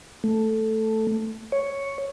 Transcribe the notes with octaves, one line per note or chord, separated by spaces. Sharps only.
A3
C#5